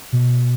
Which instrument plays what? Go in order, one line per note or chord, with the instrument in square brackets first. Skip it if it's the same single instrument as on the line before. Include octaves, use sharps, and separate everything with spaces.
[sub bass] B2